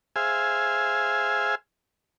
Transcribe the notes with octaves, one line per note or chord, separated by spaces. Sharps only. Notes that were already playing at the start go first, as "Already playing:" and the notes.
G#4 C5 E5 F5 G#5